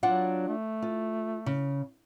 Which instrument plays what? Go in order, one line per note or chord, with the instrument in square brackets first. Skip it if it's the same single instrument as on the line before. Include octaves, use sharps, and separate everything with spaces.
[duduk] F#3 [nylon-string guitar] D4 F4 F#5
[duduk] A3
[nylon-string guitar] F4
C#3